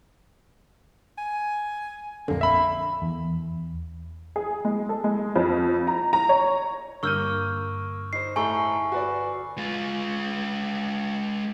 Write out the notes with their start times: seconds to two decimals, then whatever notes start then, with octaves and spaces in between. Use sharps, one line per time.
1.18 G#5
2.28 A#1 F2 D3 A#3
2.41 E5 B5
3.02 E2
4.36 G#4
4.65 G#3
4.89 A4
5.04 G#3
5.36 F2
5.87 A#5
6.13 A#5
6.29 C#5
7.03 G2 D3 A#3 C#6 E6 F6 G6 D#7
8.13 D#4 C5 C7
8.36 A2 A4 G#5 A#5 C#6
8.92 F#4 B4 D5
9.58 G#3 F4